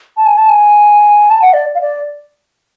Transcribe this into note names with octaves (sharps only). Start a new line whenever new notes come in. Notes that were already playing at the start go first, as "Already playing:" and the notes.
A5
G#5
A5
G#5
A5
F#5
D5
F5
D5